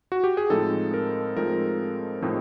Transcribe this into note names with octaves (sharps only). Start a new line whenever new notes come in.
F#4
G4
G#4
A2 F3 G#3 C4 D#4 A4
A#4
A2 F3 G#3 C4 D#4 A#4
A2 F3 G#3 C4 D#4